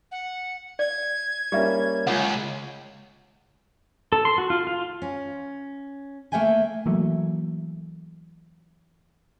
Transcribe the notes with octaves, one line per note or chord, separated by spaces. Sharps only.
F#5
D5 G#6
G3 A#3 C#4 G4 E5
C#2 F4 C#5 F#5
A4
C6
F#4
F4
F4
C#4
A3 A#3 E5 G5 G#5
E3 F#3 A3 A#3